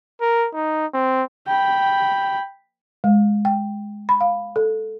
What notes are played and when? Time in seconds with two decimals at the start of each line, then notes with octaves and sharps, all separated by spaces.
0.21 A#4
0.54 D#4
0.94 C4
1.48 G5 B5
3.04 G#3
3.45 G5
4.09 B5
4.21 F5
4.56 A4